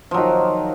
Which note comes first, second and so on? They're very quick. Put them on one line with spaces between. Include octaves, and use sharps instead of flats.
F3 F#3 D#3